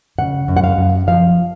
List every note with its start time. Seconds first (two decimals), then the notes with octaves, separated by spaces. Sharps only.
0.19 C#3 F#5
0.48 F#2
0.57 F#5
0.64 F5
0.77 F#2
1.07 F3 F5